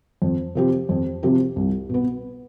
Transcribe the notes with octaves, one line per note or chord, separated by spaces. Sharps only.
F2
C3 F3 C4 G4
F2
C3 F3 C4 G4
C2
B2 B3